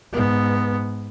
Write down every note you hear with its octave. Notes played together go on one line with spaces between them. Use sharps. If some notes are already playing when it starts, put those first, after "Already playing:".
G#2 B3